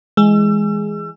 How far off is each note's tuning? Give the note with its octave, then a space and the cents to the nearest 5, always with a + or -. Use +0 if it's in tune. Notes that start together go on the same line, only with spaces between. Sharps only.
E3 -5 G#3 +0 E6 +35